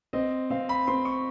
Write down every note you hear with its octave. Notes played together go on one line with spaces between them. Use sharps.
C4 D#5
C4 F5
B5
C4 C6
C#6